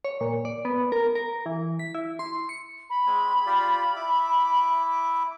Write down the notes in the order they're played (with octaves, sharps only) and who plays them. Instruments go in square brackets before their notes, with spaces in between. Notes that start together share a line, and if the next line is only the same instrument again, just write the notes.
[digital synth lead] C#5
A#2
D5
B3
A#4
A#4
E3
B6
E4
C6
C#7
[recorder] B5
[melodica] G#3 C4 G#5
F4 G4 D5
E4 E5 D6